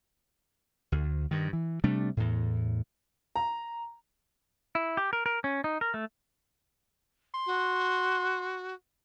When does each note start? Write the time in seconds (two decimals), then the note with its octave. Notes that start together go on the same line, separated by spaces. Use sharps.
0.92 D2
1.31 G2 D#3
1.53 E3
1.84 C3 G3 A3 D4
2.17 E2 A2
3.36 A#5
4.75 E4
4.97 G4
5.13 A#4
5.26 A#4
5.44 C#4
5.64 D#4
5.81 A#4
5.94 A3
7.34 C6
7.46 F#4